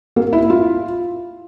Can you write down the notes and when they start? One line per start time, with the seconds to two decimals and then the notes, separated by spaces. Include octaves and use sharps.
0.16 A#3
0.33 E4
0.50 F4